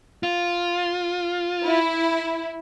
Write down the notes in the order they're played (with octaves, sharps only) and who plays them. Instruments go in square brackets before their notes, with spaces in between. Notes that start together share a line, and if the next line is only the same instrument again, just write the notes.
[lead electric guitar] F4
[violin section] E4